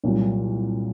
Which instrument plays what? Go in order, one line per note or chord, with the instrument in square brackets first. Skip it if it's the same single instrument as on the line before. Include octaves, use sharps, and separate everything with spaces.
[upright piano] C2 A#2 F#3